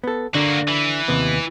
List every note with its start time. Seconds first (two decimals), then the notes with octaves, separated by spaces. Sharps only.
0.04 B3 A4
0.35 D3 A#3 F#4
0.68 E3
1.08 D#2 C3 B3